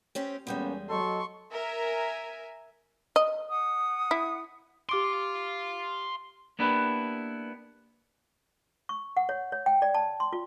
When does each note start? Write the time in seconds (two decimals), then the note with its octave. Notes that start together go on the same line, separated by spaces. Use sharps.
0.15 C4 C#4 G4
0.47 E2 G3 G#3 A#3 B3 C#4
0.89 F#3 A4 D#5 C6 C#6
1.51 A#4 E5 G#5
3.16 D#5
3.49 F#5 D#6
4.11 E4
4.89 G4 F5 C6 D6 D7
6.59 A#3 B3 D4 E4 G4 B4
8.89 C#6
9.17 F#5
9.29 C#5
9.52 C#5
9.66 G5
9.82 D5
9.94 A5
10.20 C6
10.33 F4